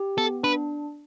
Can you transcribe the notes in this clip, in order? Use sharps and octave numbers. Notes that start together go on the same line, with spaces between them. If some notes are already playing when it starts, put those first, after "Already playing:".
Already playing: G4
B3 A4
D4 B4